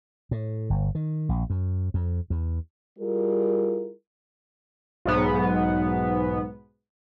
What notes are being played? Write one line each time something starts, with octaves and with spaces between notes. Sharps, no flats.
A2
G1
D#3
A#1
F#2
F2
E2
G3 E4 F4 G#4 A#4
B1 G#2 B3